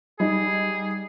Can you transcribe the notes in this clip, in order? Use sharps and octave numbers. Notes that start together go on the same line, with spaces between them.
G3 D#4 G#4